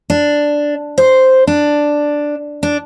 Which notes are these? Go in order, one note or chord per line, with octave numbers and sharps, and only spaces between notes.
D4
C5
D4
D4